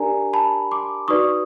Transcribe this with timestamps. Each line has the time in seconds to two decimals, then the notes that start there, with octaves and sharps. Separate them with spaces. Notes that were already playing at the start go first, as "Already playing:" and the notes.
Already playing: D4 G4 A#4 D5 G#5 A#5
0.33 A5 B5
0.71 C6 D6
1.08 D#4 F#4 B4 D5 C#6 D#6